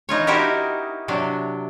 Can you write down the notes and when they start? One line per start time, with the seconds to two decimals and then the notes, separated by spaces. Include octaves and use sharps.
0.09 E3 D#4 F4 C#5
0.27 C4 D#4 E4 F#4 G4 A#4
1.08 C3 F#3 D4